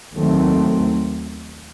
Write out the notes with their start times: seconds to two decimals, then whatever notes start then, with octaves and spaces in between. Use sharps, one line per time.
0.13 D#2 D#3 F#3 A3 C4